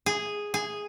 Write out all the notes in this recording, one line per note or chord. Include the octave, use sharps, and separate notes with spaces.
G#4
G#4